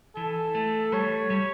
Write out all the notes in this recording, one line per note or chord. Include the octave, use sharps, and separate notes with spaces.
E3 A4
A3
G3 C#5
G3